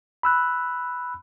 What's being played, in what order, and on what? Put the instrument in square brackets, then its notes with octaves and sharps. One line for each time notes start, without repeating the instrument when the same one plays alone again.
[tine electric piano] B5 E6 F#6